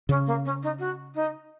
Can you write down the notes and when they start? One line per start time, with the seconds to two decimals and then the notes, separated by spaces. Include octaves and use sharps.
0.09 C#3 C#4
0.26 A#3
0.45 C#4
0.62 D#4
0.79 F#4
1.14 D#4